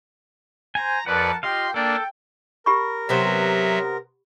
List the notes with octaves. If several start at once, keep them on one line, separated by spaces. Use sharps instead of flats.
C5 G#5 A#5
F2 A#4 B4 D5 F#5 A5
F4 G4 D#5 F5 G5 C6
A#3 D4 A4 D5 G5
G4 A#4 B5 C#6
C3 F#3 B3 C5 E5